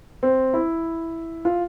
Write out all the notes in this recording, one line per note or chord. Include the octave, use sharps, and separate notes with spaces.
C4
E4
F4